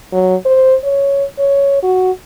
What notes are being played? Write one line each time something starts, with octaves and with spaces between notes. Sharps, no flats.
F#3
C5
C#5
C#5
F#4